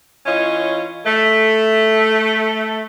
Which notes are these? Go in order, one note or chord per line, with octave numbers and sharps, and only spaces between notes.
E3 C#4 F4 C#5 D#5
A3